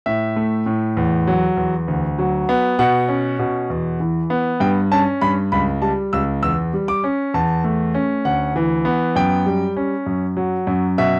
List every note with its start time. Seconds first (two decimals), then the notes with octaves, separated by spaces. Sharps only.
0.06 A2 E5
0.36 A3
0.66 A2
0.97 E2
1.27 F#3
1.57 E2
1.88 D2
2.19 F#3
2.49 B3
2.79 B2 F#5
3.08 C#4
3.39 B2
3.70 E2
4.00 E3
4.30 B3
4.60 G2 G5
4.92 C#4 A5
5.21 G2 B5
5.52 C#2 B5
5.82 G3 A5
6.13 C#2 E6
6.42 E2 E6
6.74 G3
6.88 D6
7.04 C#4
7.34 E2 A5
7.64 A3
7.94 C#4
8.25 D2 F#5
8.56 E3
8.85 B3
9.16 F#2 G5
9.46 G3
9.76 C#4
10.06 F#2
10.37 F#3
10.67 F#2
10.98 B2 E5